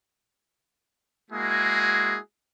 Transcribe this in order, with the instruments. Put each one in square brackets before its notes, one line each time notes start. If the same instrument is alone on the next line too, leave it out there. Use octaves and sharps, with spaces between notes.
[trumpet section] G#3 A#3 E4 F#4 G#4